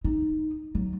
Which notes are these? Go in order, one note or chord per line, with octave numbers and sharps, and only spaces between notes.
D#4
F#3